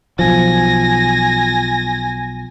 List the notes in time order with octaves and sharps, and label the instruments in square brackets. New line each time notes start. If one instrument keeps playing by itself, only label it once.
[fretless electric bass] B1 F3 [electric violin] G#5 A#6